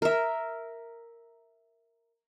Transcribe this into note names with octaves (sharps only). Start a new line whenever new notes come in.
A#4 E5